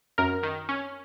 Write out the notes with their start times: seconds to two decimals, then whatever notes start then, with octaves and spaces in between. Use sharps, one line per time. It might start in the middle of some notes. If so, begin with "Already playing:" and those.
0.18 F#2 A#4
0.43 D#3
0.69 C#4